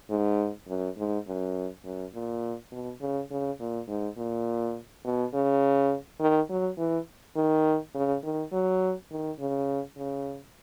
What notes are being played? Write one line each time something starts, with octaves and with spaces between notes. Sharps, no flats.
G#2
F#2
G#2
F#2
F#2
A#2
B2
C#3
C#3
A#2
G#2
A#2
B2
C#3
D#3
F#3
E3
D#3
C#3
D#3
F#3
D#3
C#3
C#3